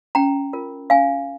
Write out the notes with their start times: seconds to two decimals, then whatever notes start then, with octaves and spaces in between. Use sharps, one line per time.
0.15 C#4 G5 A#5
0.53 F4 A#4
0.90 C#4 F5 G#5